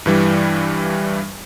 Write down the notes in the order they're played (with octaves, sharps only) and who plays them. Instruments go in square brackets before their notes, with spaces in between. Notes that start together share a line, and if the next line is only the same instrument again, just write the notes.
[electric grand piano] G2 E3 G3